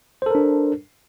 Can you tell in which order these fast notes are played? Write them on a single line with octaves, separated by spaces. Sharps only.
C5 A4 A#4 D4